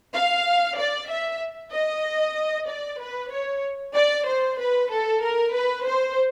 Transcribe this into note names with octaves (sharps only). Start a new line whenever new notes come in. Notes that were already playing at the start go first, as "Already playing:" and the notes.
F5
D5
E5
D#5
D5
B4
C#5
D5
C5
B4
A4
A#4
B4
C5